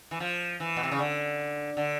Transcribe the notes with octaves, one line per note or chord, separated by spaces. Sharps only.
E3
F3
E3
B2
C3
C#3
D3
D3